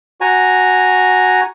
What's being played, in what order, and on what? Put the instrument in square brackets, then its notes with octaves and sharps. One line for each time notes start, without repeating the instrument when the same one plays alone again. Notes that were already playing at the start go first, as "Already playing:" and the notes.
[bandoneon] F#4 G#5 A#5